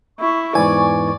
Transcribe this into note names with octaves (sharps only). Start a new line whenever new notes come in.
E4 C#6
E2 G#2 E3 D5 G#5